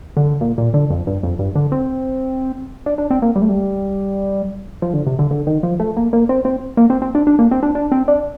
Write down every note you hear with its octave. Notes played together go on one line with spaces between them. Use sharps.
D3
A#2
A#2
D3
F2
G2
F2
G2
D3
C4
D4
D4
C4
A#3
G3
A3
G3
F3
D3
C3
D3
D3
D#3
F3
A3
A#3
A#3
C4
C4
A#3
C4
C4
D4
D4
A#3
C4
D4
D4
C4
D4